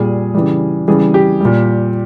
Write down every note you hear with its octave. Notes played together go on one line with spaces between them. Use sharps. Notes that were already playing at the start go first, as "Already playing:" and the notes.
Already playing: A#2 G3 G#4
C#3 E3 G3
C#3 E3 G3 G#4
G4
A#2 G3